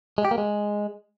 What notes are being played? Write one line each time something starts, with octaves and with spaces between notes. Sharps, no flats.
G#3
G4
A#3
G#3